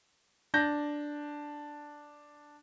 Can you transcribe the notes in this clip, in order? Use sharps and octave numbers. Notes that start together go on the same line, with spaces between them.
D4 G6 A#6